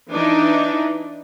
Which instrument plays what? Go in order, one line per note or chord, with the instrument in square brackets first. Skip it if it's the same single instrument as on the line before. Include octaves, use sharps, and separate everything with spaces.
[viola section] E3 D4 D#4